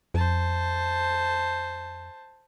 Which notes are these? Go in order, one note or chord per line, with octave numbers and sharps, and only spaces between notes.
F2 C5 A5